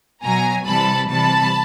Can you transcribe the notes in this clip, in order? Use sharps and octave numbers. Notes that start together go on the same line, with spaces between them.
B2 F#3 G#5 A#5
C3 E3 G3 A5 B5
C3 E3 G3 A5 B5